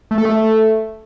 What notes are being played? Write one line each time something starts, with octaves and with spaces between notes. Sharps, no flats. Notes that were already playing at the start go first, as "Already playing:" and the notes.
A3
A4
A3